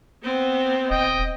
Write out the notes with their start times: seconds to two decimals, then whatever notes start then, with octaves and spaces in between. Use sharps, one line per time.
0.23 B3 C4
0.91 D#1 D#5 G5